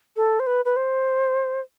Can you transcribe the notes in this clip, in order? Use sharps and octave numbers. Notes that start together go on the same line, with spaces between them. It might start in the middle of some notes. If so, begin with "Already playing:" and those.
A4
C5
B4
B4
C5